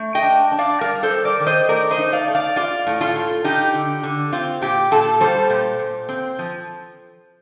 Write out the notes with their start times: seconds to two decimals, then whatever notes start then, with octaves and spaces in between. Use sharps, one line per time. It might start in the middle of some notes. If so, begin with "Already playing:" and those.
Already playing: A3
0.15 D#5 G5
0.23 D4
0.52 D4
0.58 D5 F5
0.81 G3 A#4 D5
1.03 A4 C5
1.10 G3
1.25 A#4 D5
1.40 D#3
1.47 C5 D#5
1.69 A3 A#4 D5
1.91 C5 D#5
1.98 D#4
2.12 D5 F5
2.28 A3
2.35 D5 F5
2.56 F4 D5 F5
2.87 A2
3.01 F4 A4
3.16 F4
3.44 D#4 G4
3.74 D3
4.03 D3
4.33 C4 F4
4.62 A#2 G4
4.91 A#2 F4 A4
5.20 G3 A4 C5
5.50 A#2
5.79 A#2
6.09 C4
6.39 F3